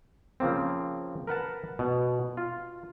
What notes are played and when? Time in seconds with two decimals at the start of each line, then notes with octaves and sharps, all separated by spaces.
0.40 C#3 F3 A#3 C4
1.27 A#4 B4 F#5 A5
1.79 B2
2.37 F4